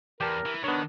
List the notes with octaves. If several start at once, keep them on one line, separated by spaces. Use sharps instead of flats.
E2 G4 A#4 A5
E3
D#3 B3 D4 C#5